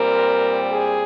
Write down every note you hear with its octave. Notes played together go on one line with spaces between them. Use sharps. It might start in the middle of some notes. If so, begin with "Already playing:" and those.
Already playing: A#2 G3 C4 A#4
G#4